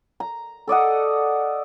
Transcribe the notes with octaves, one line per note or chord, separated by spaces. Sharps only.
A#5
A4 D5 D#5 F#5